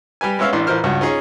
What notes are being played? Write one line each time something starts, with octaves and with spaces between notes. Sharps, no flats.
G3 G4 B4 G#5
G#3 B3 C#4 E5 F5
A1 A2 E3 D4 C6
A1 E3 F4 A#4 C5 F6
C#2 G2 F#4 F#5
C#4 D#4 F4 G#4